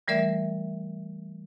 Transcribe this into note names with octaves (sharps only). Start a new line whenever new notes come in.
E3 G3 A3 A#4 D5 E5